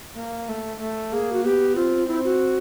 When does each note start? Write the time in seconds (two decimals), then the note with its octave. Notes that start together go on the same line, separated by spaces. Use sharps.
0.16 A#3
0.48 A3
0.80 A3
1.12 A#3 G#4
1.33 F#4
1.44 B3 G4
1.75 C4 F4
2.08 C4 E4
2.24 F#4